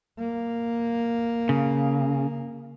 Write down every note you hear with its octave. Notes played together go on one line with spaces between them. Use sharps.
A#3
C#3